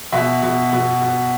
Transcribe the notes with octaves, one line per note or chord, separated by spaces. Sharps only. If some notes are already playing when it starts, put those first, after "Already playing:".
B2 E5
B2
B2
B2